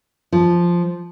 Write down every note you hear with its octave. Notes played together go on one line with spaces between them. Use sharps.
F3